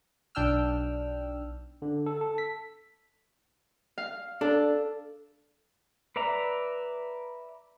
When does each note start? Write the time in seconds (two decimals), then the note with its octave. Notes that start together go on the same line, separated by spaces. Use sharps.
0.35 B1 D4 G5 E6 F6
1.82 D3
2.06 A4
2.21 A4
2.38 B6
3.98 F5
4.41 D4 A4
6.16 B4 D5 E5 A#5